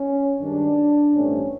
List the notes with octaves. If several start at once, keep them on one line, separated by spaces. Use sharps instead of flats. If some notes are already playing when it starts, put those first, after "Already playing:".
Already playing: C#4
G2 D#3 G#3 D4
A1 G2 E3 A3 C4 C#4